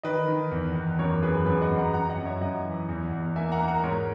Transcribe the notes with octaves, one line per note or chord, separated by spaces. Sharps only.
D#3 B4 D#5
D#3
E2
E2
F#2 A#4 C#5
F#2 G#4 B4
F#2 G#4 B4
D#5 F#5
F#2
F#5 A#5
F#2 F#5 A#5
D#5 F#5
F#2
C#5 E5
F#2 D#5 F#5
E3
E2
E2
A#3 E5 G#5
F#5 A#5
A#3
F#5 A#5
G#2 A#4 C#5